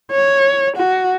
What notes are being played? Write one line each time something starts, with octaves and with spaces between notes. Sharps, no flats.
C#5
F#4